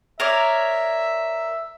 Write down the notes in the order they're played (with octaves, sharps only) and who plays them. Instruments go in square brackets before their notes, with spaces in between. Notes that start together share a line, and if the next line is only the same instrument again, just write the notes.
[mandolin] A#4 C#5 D5 [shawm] E5